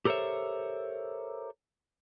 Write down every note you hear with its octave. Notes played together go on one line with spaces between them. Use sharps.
G4 A4 A#4 C5 C#5 E5